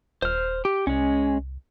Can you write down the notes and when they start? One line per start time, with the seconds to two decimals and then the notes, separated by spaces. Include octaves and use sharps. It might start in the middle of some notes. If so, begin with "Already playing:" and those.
0.22 D#1 C5 F6
0.65 G4
0.87 C2 G#3 C#4